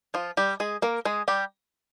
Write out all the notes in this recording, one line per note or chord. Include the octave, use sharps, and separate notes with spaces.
F3 F4
G3 G4
G#3 G#4
A#3 A#4
G#3 G#4
G3 G4